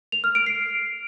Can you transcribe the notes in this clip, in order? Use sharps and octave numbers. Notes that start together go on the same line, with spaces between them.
F7
F6
D7
C7